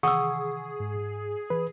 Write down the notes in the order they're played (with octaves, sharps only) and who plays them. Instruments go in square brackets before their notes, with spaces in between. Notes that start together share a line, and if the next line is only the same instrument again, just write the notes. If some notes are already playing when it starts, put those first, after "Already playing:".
[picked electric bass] C3 D#3 E3 [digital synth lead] G#4 [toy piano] F#5 E6 [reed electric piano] C#6 D#6
[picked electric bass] G#2
[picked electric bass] E3 [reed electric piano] B4